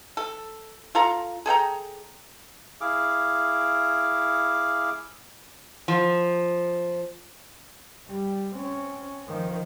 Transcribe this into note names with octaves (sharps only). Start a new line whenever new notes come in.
A4
F4 A4 A#5
G#4 A4 G5 A#5
E4 G#4 F5 D6
F3
G3
C4 C#4
D#3 F3